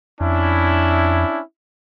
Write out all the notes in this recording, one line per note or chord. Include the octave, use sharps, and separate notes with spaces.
F2 C#4 D4 E4